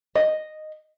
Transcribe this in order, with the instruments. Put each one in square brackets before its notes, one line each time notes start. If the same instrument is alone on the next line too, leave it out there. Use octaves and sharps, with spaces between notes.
[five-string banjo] D#5